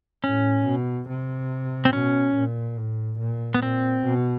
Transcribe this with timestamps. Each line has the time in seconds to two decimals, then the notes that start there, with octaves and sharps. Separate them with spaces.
0.24 A2 C#4
0.67 B2
1.09 C3
1.85 C4
1.93 B2 C#4
2.36 A#2
2.77 A2
3.19 A#2
3.54 B3
3.62 A#2 C4
4.05 B2